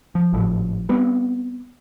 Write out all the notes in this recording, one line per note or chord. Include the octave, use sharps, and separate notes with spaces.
F3
G#1 A2 F3
G3 B3 C4